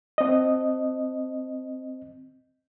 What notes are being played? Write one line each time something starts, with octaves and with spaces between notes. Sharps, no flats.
C4 D#5